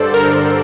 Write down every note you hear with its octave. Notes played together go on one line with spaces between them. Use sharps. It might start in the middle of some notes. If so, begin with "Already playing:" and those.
Already playing: G2 D3 A4 C5 D5
A#4